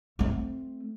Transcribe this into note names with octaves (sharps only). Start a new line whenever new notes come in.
A3 C4